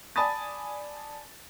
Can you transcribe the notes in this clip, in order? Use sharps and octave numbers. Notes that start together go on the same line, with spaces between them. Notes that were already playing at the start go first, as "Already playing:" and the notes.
D5 G#5 A5 B5 D#6 A6